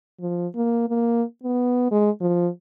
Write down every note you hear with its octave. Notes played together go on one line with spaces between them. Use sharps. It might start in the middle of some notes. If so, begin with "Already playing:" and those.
F3
A#3
A#3
B3
G#3
F3